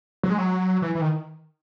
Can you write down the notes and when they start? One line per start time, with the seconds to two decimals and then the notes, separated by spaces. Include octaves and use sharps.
0.23 F#3
0.30 G#3
0.38 F#3
0.82 E3
0.95 E3
1.01 D#3